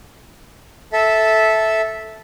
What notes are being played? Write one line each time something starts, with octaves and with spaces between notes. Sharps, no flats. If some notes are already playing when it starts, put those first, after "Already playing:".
A4 E5